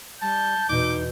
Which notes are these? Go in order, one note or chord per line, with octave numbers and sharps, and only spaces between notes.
G3 A5 G6
E2 B2 D#4 D6